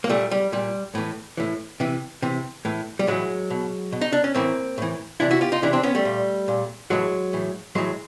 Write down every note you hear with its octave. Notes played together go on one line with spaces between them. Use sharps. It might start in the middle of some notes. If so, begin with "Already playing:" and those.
A#3
A#2 G3 A3
G3
A#2 G3
A2 E3
A2 E3
C3 E3
C3 E3
A2 E3
G3
A2 E3 F#3 G#3
B2
B2
D#4
D4
C#4
A2 E3 A#3 C4
A2 E3
C3 E3 D4 E4
E4 F#4
F4 G4
D#4 F4
C3 E3 D4 E4
C4 D4
B3 C#4
G3 A3
A#2
A#2
A2 E3 F#3 G#3
A2 E3
A2 E3 F#3 G#3